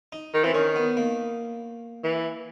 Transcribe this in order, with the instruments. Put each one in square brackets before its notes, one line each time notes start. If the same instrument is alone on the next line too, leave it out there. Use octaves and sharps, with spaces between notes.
[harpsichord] D#4
[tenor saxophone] D#3
[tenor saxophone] E3 [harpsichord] C4
[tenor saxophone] D#3 [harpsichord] C#4
[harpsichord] B3
A#3
[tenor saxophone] E3